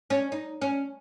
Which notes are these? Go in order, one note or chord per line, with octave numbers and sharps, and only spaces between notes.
C#4
D#4
C#4